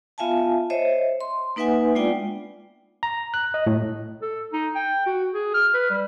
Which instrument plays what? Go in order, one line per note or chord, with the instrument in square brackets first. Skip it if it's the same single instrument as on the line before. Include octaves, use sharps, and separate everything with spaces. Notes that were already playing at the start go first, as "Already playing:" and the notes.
[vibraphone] B3 F4 E5 F5 G#5 A5
C5 C#5 D#5 E5
C6
A#3 D#4 B4 E5 F#5 G#5
G#3 B3 D4 F4 D5 G5
[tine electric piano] A#5
F#6
D#5
A2
[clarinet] A4
D#4
G5
F#4
G#4
F6
B4
G3